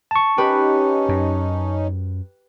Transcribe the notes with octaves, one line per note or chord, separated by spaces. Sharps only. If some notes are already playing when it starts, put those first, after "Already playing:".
A5 C#6
C#4 D#4 G4 B4
F#2